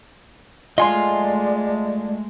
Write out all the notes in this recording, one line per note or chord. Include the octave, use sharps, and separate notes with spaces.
G#3 A3 F4 D5 D#5 G#5 C6